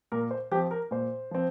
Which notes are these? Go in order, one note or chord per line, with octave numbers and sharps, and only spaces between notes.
A#2 A#4
C5
F3 C4 G4
A#4
A#2 C5
F3 C4